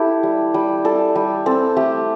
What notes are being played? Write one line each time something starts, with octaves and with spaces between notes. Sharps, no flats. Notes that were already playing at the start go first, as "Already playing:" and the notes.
Already playing: E4 G4 A4
G3
G3
G3 A4
G3
C4 A4
A3 G4